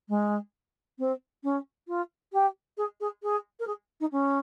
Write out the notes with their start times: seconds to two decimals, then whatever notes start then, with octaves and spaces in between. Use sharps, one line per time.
0.09 G#3
0.99 C4
1.44 C#4
1.88 F4
2.33 G4
2.77 G#4
3.00 G#4
3.23 G#4
3.60 A#4
3.67 G#4
4.00 D#4
4.12 C#4